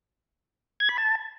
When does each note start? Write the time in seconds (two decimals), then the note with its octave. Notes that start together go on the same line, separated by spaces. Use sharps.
0.80 G#6
0.89 B5
0.98 A5